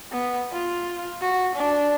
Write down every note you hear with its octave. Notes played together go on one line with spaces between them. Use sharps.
B3
F4
F#4
D4